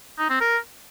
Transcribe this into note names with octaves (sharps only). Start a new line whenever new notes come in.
D#4
C4
A#4